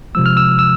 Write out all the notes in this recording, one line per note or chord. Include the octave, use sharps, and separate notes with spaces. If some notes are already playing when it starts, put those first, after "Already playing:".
C3 F3 G#3 E6
F6
E6
E6